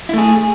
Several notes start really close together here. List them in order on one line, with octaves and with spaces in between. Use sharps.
E4 A3 G#4